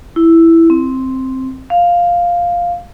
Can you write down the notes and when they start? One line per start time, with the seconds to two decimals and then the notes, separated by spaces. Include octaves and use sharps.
0.16 E4
0.70 C4
1.70 F5